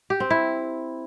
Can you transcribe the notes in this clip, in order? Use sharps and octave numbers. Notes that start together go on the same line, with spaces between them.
G4
C4
E4